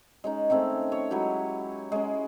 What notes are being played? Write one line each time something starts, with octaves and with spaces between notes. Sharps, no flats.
G#3 C#4 D#4
D#3 A3 C4 C#4
C#5
F#3 G#3 E4 G4
G#3 C#4